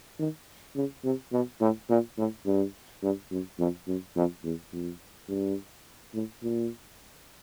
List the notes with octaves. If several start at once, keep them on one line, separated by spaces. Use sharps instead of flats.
D#3
C#3
C3
B2
A2
A#2
A2
G2
G2
F#2
F2
F#2
F2
E2
F2
G2
A2
A#2